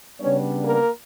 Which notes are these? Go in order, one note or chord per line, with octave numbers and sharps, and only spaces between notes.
C#3 G3 B3 C#4 D4 C#5
A#3 A#4